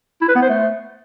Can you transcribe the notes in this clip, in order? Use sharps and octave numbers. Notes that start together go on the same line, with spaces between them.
E4
B4
B3
C5
A3